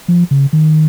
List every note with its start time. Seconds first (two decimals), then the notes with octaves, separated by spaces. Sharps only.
0.08 F3
0.31 C#3
0.53 D#3